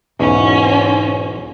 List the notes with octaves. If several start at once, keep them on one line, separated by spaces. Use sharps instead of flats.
B1 E2 G#2 C#4